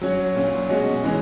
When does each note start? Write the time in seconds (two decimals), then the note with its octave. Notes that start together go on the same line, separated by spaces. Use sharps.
0.01 F#3 C#4 F#4 C#5
0.35 A#2 F#3 C#4
0.69 B2 G#3 C#4 F#4
1.04 E3 G#3 C#4